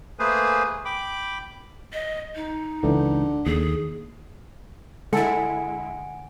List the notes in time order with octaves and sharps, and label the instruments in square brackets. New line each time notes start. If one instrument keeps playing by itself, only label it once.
[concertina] A3 A#3 G#4 B4 C5 G#5
G5 B5 D6
[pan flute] D#5
D#4
[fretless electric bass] C#2 E3 [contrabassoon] D3
[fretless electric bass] D#2 [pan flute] G#4
[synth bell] D3 D7 [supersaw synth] G#3 E4 [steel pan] A4 [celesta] F#5 G#5 C#7